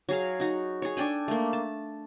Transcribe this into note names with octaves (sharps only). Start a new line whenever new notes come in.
F#3 G#4 F5
D#4 F#4
G#4 C#5
D4 A4 G5 G#5
A3 A#3
A5